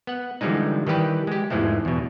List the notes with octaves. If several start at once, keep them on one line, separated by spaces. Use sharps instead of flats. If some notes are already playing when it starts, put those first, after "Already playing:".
B3 F#5
D3 E3 F3 G3 G#3 D#4
D#3 E3 G3 G4 B4
G#3 G4
E2 G#2 E3 F3 G#3 A3
E2 B2